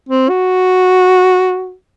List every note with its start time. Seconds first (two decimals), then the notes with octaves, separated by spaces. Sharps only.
0.09 C4
0.29 F#4